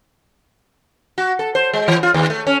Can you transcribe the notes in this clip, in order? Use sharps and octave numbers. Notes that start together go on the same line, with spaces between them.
F#4
A4
C5
G#3
E3
F4
D#2
A3
C#4